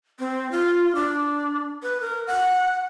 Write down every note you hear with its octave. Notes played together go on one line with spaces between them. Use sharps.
C4
F4
D4
B4
A#4
F#5